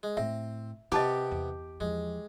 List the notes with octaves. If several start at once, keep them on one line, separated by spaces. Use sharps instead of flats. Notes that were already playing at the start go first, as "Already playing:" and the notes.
G#3
A2 C4 E5
C3 B3 C4 G4 D#5 A5 D6
E2
E2 F3 G#3